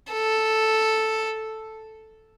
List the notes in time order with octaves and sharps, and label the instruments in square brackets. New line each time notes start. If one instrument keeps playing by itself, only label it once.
[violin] A4